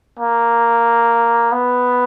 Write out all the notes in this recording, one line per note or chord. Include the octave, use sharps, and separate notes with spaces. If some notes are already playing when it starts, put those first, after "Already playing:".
A#3
B3